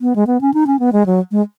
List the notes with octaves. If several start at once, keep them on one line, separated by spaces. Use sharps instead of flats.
B3
G#3
B3
C#4
D#4
C#4
B3
G#3
F#3
G#3